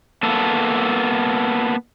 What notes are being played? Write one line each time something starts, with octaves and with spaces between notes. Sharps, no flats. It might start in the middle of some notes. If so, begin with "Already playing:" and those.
A#3 B3 A4